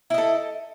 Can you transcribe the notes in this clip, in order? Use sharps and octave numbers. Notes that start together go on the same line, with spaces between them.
E4 A4 D#5